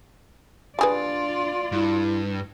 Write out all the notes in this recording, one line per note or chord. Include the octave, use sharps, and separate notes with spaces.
G3 D4 F4 G#4 B4 D5
G2 E4